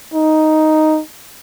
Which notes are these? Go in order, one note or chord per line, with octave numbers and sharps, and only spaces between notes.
D#4